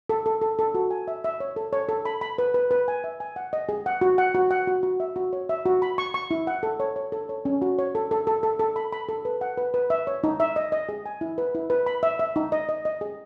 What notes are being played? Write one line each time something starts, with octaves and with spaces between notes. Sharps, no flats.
A4
A4
A4
A4
F#4
G#5
E5
E5
C#5
A4
C#5
A4
B5
B5
B4
B4
B4
G#5
E5
G#5
F#5
D#5
G#4
F#5
F#4
F#5
F#4
F#5
F#4
F#4
E5
F#4
C#5
E5
F#4
B5
C#6
C#6
E4
F#5
A4
C#5
C#5
A4
C#5
C#4
F#4
C#5
A4
A4
A4
A4
A4
B5
B5
A4
B4
F#5
B4
B4
E5
C#5
D#4
E5
D#5
D#5
G#4
G#5
E4
B4
E4
B4
B5
E5
E5
D#4
D#5
D#5
D#5
G#4